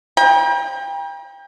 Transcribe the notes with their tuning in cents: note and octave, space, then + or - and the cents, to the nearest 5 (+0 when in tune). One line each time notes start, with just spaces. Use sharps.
G5 +30 A#5 +40